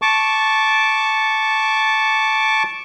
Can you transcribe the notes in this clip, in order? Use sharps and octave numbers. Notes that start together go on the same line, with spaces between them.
A5 C#6 D6